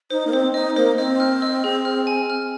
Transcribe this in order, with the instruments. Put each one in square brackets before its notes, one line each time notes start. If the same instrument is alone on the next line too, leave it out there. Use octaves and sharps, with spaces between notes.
[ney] D#4 [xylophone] C5
[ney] A#3
[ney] C4 [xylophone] C5
[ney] D#4 [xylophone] D#5
[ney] A#3 [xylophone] C5
[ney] C4 [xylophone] D#5
[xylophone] F6
D#5
G#4
F6
G#5
F6